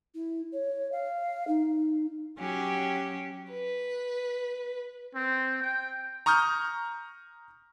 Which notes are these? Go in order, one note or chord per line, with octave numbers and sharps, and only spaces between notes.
E4
C#5
F5
D#4
F#3 C#4 G4
B4
C4
G5
A#5 C#6 D#6 F6 G6